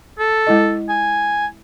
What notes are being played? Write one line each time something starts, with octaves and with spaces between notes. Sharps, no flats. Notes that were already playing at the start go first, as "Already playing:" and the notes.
A4
G#3 E4 D#5
G#5